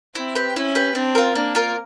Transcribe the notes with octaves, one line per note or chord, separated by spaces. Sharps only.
C4 E4
G4 B4
C#4 E4
G4 B4
C4 D4
F4 A#4
A#3 D4
F4 A#4